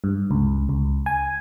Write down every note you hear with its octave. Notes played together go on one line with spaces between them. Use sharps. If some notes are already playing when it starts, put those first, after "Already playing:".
G2
C#2
C#2
G#5